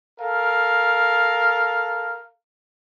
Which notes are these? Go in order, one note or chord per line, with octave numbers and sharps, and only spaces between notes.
A4 A#4 F5